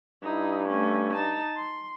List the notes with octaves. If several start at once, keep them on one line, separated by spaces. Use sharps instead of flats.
G2 D#4 E4
A3 C#4
D#4 A5
C6